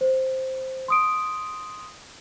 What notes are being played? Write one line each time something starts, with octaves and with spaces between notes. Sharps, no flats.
C5
C6 D#6 D7